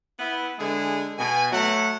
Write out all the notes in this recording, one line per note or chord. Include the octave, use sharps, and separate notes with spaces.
B3 E4
D3 G#3 E4 G#4
B2 G#5
F#3 A3 F#5